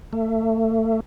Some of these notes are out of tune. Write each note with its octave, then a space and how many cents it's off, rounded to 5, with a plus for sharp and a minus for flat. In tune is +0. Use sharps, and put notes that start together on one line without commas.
A3 +30